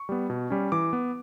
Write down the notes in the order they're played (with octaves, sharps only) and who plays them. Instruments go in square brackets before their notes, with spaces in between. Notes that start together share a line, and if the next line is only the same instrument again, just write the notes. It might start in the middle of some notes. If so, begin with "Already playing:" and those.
Already playing: [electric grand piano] C#6
G3 B3
B2
G3 C#4
E3 D6
B3